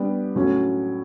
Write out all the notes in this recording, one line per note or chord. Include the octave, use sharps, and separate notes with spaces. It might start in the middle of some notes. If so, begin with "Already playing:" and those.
Already playing: G3 B3 D4 G4
A2 F#3 C#4